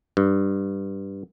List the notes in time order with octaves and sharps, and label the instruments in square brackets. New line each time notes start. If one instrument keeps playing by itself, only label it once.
[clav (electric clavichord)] G2